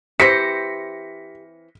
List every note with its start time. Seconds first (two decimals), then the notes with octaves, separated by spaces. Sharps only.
0.20 E3 C4 G4 C5 A#6 B6 C#7